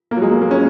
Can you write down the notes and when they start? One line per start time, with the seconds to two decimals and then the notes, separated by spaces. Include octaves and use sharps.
0.11 A#3
0.17 F#3
0.22 G#3
0.31 A#3
0.41 A#3
0.51 C#4